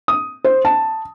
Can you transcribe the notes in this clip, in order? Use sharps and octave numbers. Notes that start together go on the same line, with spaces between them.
D#6
C5
A5